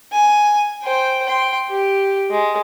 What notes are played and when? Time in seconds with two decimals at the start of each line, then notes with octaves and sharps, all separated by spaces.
0.13 G#5
0.83 C5 G5
1.26 G5 C6
1.70 G4
2.31 G#3